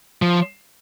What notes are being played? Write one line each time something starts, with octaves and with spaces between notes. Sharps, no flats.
F3